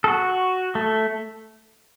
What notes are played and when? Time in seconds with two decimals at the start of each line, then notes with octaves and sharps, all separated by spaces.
0.04 A4
0.08 F#4
0.75 A3